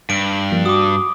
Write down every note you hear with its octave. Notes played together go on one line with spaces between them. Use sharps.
G2 D7
F3 A#3
F#4 D6 D#6